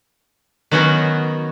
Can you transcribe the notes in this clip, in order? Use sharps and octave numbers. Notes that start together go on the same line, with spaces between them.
D#3 F#3 B3 C#4 D#4 F#4